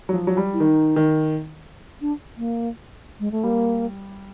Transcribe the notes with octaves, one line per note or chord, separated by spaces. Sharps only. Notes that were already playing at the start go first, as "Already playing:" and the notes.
F#3
F3
F#3
G3
E4
D#3 D#4
D#3
D4
A#3
G#3
A3
G3 A#3